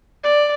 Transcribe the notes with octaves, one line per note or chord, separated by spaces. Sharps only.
D5